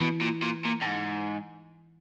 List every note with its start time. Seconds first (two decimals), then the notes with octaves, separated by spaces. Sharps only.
0.01 B2 E3
0.21 A#2
0.42 A#2
0.65 A#2
0.82 A2
0.86 G#2